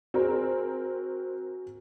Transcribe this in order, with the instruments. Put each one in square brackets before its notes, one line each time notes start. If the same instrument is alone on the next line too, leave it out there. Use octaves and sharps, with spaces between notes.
[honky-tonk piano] C4 A#4 [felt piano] F#4 G#4